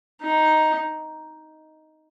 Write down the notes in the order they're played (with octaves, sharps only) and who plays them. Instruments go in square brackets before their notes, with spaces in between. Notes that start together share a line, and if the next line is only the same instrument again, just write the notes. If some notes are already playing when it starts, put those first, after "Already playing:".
[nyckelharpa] D#4